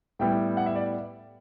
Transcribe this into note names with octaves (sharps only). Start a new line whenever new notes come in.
A2 G3 B3 E4 G5
F#5
E5
D5